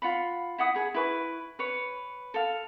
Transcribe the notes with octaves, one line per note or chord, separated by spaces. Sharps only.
F4 F#5 B5
E4 F#5 D#6
G#4 B5
E4 B4 C#6
B4 C#5
A4 F5